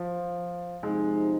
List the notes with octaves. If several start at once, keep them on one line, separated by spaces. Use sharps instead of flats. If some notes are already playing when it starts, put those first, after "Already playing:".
Already playing: F3
C3 F3 G#3 C4 D#4